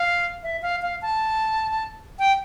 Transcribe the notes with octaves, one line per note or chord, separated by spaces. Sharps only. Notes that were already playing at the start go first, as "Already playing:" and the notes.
Already playing: F5
E5
F5
F5
A5
G5